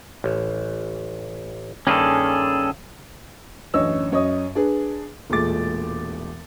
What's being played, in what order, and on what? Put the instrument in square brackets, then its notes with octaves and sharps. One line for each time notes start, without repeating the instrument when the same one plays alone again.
[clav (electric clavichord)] A1
[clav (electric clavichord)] G2 D#3 A#3 [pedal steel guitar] C#4 G#4 A4
[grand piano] A1 F#2 D4 C#5 D#5 E6
F#2 C#5 D#5 D#6
D4 G#4 B4
E1 A#2 G#3 A3 D6 A6